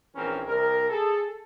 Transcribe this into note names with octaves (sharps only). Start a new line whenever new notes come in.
A#1 E3 C4 C#4 G#4 A#4
C2 A#4
G#4 A4